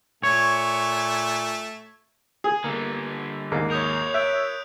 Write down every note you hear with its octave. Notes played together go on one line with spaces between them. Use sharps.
A#2 A3 C#5 C#6
G#4
D3 G3 A#3
D#2 G#2 A#3
A#4 C#5 D#6 G6 F7
E5 F#6 G6 D7